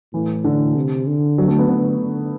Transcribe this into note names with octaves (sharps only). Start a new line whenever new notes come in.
A2 E3
D3
C3
D3
F#3
A3
B3
D3 B3
D3